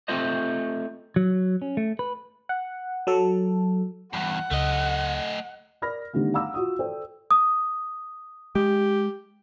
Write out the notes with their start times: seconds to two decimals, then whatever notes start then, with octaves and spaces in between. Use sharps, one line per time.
0.08 A3 C4 F4 C5 D#5
1.16 F#3
1.62 C#4
1.77 A3
1.99 B4
2.49 F#5
3.07 F#3 A4
4.13 E2 G2 F#5
4.51 C#2 A3 D#5
5.82 A#4 D5 B5 F6 A#6
6.13 D3 D#3 G3 A3 B3
6.34 F5 F#5 A#5 B5 D6 E6
6.54 F4 F#4 D#6
6.79 A4 C5 D5 G5
7.31 D#6
8.55 G#3 G4